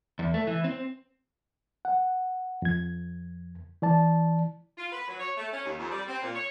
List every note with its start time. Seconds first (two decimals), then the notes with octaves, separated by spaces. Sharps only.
0.19 E2
0.34 A3
0.47 E3
0.64 C4
1.85 F#5
2.62 F2 G#6
3.82 E3 D5 A5
4.78 F4
4.92 B4
5.08 F#3
5.20 C#5
5.37 A3
5.53 C#4
5.65 D#2
5.79 F2
5.91 G3
6.08 C4
6.23 A#2
6.35 C#5